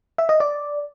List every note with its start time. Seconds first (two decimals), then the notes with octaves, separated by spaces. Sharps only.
0.18 E5
0.29 D#5
0.40 D5